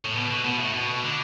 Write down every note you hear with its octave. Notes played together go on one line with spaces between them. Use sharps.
A2
B2
B2
B2
A2
B2
D3